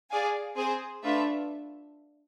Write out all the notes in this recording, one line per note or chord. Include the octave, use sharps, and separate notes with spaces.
G#4 D5 F5 G#5
C4 G#4 C5 G#5
A3 D4 F4 B4 E5